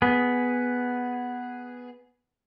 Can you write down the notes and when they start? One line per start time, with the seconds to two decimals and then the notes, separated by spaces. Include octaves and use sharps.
0.02 B3 G#4